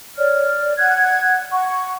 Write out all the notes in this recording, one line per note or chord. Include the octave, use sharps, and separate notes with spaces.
C#5 D5 F6
F#5 F#6 G#6
F#5 C#6